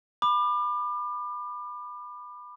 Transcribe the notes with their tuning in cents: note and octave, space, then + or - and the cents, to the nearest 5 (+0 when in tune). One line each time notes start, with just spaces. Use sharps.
B5 +0 D6 +35